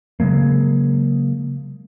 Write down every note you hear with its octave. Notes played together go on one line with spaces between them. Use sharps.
C#3 F#3 G#3 A#3